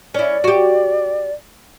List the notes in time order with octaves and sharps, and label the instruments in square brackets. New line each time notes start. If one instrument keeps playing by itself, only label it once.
[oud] C#4 E4 [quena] D5
[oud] F#4 G4